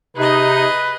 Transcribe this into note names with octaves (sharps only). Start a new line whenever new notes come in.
C3 D#4 G#4 B4 D#5